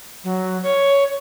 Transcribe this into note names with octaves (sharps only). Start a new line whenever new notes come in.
F#3
C#5